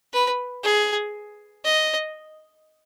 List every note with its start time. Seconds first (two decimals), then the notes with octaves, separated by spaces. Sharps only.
0.13 B4
0.64 G#4
1.64 D#5